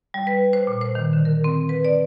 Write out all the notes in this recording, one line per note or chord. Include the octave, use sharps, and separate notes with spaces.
G3
B4
C5
A#2
C5
D#3
D3
A#4
C4
B4
D5